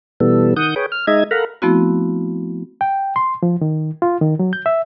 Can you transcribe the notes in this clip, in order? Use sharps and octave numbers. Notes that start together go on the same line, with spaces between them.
B2 E3 G3 B3 A4
D#3 F#5 D#6 G6
G#4 B4 C#5 G5
F6
G#3 D#4 D#5 E5 G#6
A4 A#4 F5 F#5 A#5 B5
F3 A3 B3 C4 E4 F#4
G5
C6
F3
D#3
F4
D#3
F#3
G6
E5